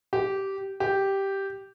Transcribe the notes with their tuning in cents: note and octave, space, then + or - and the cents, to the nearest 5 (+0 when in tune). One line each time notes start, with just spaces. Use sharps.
G4 -15
G4 -5